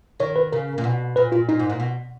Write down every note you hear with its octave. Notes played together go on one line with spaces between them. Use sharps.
D#3 C#5
B4
C#3 A#4
A#2
B2
A#2 B4
A#2 F4
A#2 D#4
G#2
A#2
B2